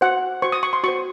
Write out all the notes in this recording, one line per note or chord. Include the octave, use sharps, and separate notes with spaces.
F#4 C5 F#5
F#4 C5 C#6
D#6
C#6
C6
F#4 C5 C#6